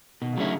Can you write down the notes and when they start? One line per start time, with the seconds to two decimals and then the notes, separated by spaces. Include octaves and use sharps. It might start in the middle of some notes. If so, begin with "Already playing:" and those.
0.21 B2 D#3
0.33 C#3
0.37 D3 F#3 A3 C#4 E4